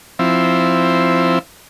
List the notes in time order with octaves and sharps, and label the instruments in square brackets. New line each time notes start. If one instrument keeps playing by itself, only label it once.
[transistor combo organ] F3 C4 E4